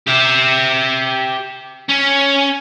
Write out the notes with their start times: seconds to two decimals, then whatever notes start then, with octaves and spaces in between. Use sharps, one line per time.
0.07 G4 E5
1.89 C#4